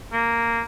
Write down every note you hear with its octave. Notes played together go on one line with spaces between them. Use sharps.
A#3